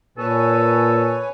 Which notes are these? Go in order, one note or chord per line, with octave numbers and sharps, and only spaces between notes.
A#2 A4 B4 C#5 G#5